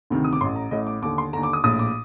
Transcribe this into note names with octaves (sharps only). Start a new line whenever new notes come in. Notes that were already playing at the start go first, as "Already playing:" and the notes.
D2 C3 D#3
D#6
D6
A1 A2 C6
A#5
A1 A2 D#5
D6
D#2 D3 D6
C6
D#2 D3 A#5
D6
D#6
A#1 A2 D#6
D6